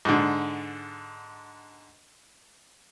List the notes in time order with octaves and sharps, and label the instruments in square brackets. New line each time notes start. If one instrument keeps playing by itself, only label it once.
[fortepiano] G#2 D3